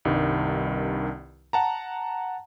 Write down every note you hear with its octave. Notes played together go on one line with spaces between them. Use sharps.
C2 G2 D#3
F#5 A5 A#5